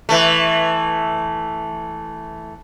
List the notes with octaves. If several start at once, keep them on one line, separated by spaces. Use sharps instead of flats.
E3 A3